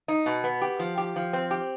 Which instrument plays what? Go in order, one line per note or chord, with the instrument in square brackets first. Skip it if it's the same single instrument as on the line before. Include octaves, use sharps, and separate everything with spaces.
[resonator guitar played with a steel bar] D#4
B2
B3
G4
F3
G4
F3
C4
G4